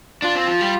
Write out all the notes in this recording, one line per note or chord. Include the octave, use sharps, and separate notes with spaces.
D4 F4
C4
F3
G3